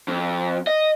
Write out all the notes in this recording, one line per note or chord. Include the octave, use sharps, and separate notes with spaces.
F2
D#5